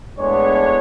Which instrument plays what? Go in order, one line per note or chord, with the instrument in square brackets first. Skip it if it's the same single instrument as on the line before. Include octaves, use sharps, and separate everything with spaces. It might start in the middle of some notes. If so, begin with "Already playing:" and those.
[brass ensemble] A2 G#3 B3 D4 C#5